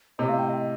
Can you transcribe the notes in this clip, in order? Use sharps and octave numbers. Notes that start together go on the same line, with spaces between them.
A2 C3 D#5
F5
G5
D#5